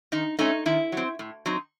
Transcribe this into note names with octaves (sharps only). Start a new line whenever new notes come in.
D#3 D#4
A3 C#4 D#4
D#3 E4
F#3 C4
A2
F#3 C4 D#4